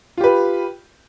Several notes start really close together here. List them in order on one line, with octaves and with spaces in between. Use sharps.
F4 G4 B4